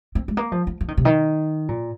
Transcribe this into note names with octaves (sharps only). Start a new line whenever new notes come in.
C4
G#3
A#3
F3
F3
F3
D#3
C3
D#3
A#2